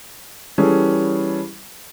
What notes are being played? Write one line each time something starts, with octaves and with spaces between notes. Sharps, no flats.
E3 G3 C#4 G#4 A4